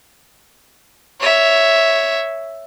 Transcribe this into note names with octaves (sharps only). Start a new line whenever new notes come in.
C#5 E5